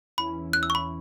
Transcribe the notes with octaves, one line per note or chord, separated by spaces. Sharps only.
E2 E3 C#4 E4 B5
E2 E3 C#4 E4 F#6
E6
C#6
B5